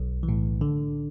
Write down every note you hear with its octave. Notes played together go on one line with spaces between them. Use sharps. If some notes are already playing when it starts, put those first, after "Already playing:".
Already playing: B1
E3
A2
D3